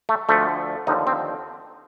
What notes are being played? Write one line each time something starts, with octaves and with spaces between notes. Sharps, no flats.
A3
D2 D3 F3 A3
D#2 D3 F3 D#4
C4